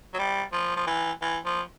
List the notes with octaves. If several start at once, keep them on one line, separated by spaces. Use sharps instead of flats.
F#3
G3
F3
F3
E3
E3
F3